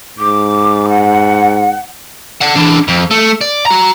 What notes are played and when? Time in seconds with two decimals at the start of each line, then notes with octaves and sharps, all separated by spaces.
0.19 G#2 D6
0.89 F#5
2.41 D5 F#5
2.55 E3 D4
2.88 F2
3.11 A3
3.41 D5
3.66 F#4 A#5